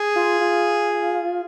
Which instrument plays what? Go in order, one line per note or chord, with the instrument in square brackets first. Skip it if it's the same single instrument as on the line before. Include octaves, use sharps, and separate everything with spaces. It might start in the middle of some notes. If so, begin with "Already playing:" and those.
Already playing: [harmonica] G#4
[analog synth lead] F4
F4